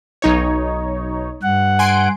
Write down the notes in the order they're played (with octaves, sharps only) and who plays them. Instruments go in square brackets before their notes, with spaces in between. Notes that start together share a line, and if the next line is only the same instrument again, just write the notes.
[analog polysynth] B1 D#4 C#5
[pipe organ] G2 F#5
[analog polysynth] G#5 C6 D7